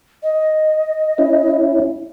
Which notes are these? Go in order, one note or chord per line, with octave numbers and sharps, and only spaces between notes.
D#5
C#4 E4